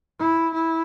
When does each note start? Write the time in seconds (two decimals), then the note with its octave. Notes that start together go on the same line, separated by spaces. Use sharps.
0.20 E4
0.54 E4